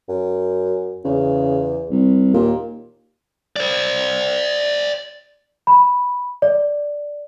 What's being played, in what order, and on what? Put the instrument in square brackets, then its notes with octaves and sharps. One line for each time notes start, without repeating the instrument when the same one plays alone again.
[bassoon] F#2
[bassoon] E2 [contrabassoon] C#3
[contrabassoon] C2
[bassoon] D#2 [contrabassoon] A#2
[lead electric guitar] C5 D5
[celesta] B5
D5